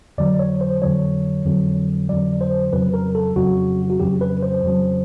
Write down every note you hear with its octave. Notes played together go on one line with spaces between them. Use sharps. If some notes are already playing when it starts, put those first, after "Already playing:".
F2 D3 F#3 D5
C#5
C5
F2 D3 F#3 C#5
F2 D3 F#3
F2 D3 F#3 D5
C5
F2 C#3 F#3 B4
A#4
A4
F2 C#3 F#3 F#4
F#4
F2 C#3 F#3 G4
B4
C5
F2 C#3 F#3